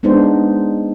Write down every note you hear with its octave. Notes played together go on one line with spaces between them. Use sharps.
G#3 B3 D4 D#4 C5